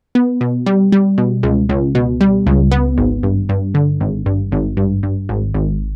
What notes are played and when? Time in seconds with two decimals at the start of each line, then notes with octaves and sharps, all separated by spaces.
0.15 B3
0.41 B2
0.66 G3
0.92 G3
1.18 B2
1.43 C#2
1.69 C#2
1.95 B2
2.21 G3
2.47 C#2
2.71 B3
2.98 G#1
3.23 G2
3.49 G2
3.74 D3
4.01 G#1
4.26 G2
4.52 G#1
4.77 G2
5.03 G2
5.29 G#1
5.54 G#1